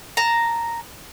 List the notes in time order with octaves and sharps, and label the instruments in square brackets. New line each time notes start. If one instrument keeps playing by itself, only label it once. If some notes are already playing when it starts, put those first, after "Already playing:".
[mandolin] A5 A#5